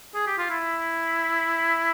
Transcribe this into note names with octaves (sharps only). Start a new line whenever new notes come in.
G#4
G4
F4
E4